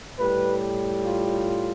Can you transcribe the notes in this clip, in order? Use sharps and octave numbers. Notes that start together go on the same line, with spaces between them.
A2 G3 B4
F4